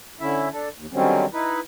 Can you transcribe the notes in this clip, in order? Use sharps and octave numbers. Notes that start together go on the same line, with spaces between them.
D3 C#4 E4 E5
D4 A4
D#2
D3 D#3 F#3 G3 C4 C#4
D#4 E4 B4